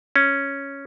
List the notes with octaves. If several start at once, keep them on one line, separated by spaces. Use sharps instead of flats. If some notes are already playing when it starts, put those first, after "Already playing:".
C#4